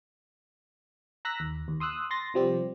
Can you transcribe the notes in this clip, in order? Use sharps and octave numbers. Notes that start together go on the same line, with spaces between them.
A#5 E6 F#6 A#6 B6
D#2
D#2
C6 D#6 E6 F#6
C6 A6 A#6
C3 F3 G3 C4 G4